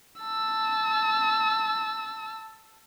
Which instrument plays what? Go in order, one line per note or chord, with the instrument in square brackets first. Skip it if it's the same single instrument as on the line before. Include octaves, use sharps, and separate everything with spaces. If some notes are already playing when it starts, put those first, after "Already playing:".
[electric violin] A5 E6